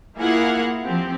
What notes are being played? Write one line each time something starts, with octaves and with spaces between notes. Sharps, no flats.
A#3 E4 F4 G#4 F5 F#5
F3 C4 G4